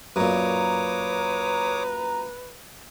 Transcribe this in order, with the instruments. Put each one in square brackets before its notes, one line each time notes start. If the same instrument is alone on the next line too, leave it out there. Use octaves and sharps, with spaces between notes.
[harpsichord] F#2 A#2 [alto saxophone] B4 [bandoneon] C#5 D6 D#6 [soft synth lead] A#5